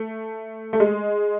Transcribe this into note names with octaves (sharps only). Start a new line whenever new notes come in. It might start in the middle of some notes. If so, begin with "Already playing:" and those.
Already playing: A3
A3
G#3